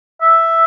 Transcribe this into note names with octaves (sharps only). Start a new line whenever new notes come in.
E5